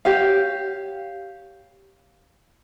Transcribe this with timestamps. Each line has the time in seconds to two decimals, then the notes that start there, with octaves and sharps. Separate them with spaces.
0.05 G4 C#5 F5